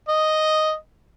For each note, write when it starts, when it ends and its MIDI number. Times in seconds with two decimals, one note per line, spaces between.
0.08 0.74 75